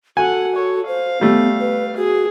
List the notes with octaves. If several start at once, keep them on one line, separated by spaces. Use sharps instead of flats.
F#4 A4 F#5 G#5
A4 C#5
C5 F5
G3 A3 B3
B4
F#4 G#4